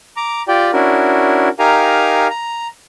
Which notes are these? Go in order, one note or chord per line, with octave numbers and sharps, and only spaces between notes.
A#5 D6
F4 G4 D5 G5
C#4 D4 E4 F#4 A#4
D#4 G4 A#4 F5 G#5 A#5
A#5